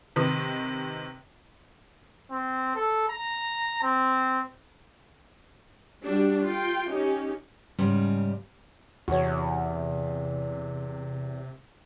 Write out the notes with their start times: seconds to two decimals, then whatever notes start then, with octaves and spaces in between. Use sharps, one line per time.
0.16 C3 D#3 B4 D#6
2.31 C4
2.75 A4
3.08 A#5
3.83 C4
6.05 G3 D4 F#4
6.47 F4 G5
6.89 C#4 D#4 G4
7.79 G#2 C#3 G3 C#4
9.08 E2 C3 F#4 C#5